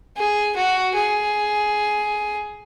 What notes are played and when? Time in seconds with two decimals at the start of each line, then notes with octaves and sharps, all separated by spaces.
0.17 G#4
0.56 F#4
0.95 G#4